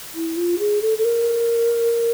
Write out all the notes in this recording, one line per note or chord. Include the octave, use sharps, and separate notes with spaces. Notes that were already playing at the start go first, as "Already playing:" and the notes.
E4
F4
G#4
A4
A4
A#4